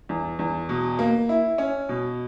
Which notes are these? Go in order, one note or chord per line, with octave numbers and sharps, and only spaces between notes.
E2
E2
B2
A#3
E4
C#4
B2